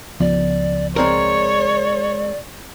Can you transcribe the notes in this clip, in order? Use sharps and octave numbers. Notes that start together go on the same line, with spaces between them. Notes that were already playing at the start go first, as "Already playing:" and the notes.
C#2 F3 B3 D5
G#3 C4 A#4 C#5 D5